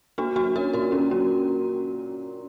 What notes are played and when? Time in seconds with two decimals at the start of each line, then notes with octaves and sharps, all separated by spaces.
0.18 A#3 D4 F#4
0.36 F#3 D4 F#4
0.55 C#4 F#4 A#4
0.73 A#2 F#4 A#4
0.92 A#3 C#4
1.11 F#3 C#4